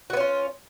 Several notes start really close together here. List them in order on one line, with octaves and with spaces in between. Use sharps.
F#4 B3 C#4 F4